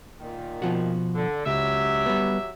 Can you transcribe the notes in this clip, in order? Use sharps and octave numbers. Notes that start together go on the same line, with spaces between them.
A#2 D#3
B2 F3 F#4
D3
C#2 F#3 G4 E5
G3 B3